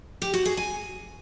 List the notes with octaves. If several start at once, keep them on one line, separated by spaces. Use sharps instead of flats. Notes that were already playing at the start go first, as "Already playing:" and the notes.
G4
F#4
G#4
G#5